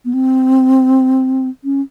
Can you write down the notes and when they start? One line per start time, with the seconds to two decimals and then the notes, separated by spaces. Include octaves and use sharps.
0.05 B3
0.14 C4
1.64 C#4